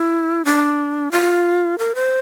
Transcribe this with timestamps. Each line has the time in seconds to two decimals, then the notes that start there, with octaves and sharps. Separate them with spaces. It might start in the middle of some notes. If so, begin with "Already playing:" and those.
Already playing: E4
0.45 D4
1.12 F4
1.79 A#4
1.95 C5